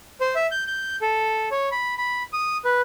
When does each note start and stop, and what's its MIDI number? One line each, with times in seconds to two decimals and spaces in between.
0.21 0.35 72
0.35 0.47 76
0.51 0.64 91
0.67 0.96 91
1.02 1.49 69
1.51 1.69 73
1.72 1.94 83
1.98 2.23 83
2.33 2.57 87
2.65 2.82 71